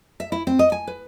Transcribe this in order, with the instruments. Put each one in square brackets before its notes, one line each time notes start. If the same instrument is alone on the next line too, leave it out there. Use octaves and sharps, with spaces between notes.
[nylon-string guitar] E5
E4
C4
D#5
G#5
B4